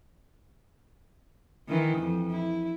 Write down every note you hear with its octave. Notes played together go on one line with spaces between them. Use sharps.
D#3 E3
F2
E4